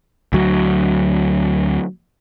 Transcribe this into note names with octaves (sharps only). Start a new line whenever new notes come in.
D2 F#3